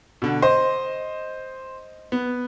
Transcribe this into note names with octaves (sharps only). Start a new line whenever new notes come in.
B2 D3
C5 D#5
B3